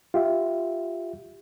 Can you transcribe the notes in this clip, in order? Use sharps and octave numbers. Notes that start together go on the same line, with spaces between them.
F4 G4 E5